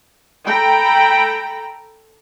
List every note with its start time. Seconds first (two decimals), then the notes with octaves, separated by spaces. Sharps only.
0.44 A4 G5 A#5 B5